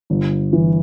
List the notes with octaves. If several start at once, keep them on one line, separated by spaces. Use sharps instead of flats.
G1
E3